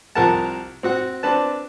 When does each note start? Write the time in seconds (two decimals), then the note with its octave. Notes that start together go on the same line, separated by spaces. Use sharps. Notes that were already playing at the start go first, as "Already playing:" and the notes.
0.15 C2 F3 A#4 F#5 A5
0.83 C4 F#4 F#5
1.23 C4 D4 B4 A5